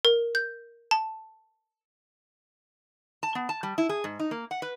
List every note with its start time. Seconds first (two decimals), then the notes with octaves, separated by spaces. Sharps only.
0.05 A#4
0.35 G6
0.91 A5
3.23 A5
3.35 B3
3.49 A5
3.63 G3
3.78 E4
3.89 G#4
4.04 G#2
4.19 D#4
4.31 A#3
4.51 F#5
4.62 B4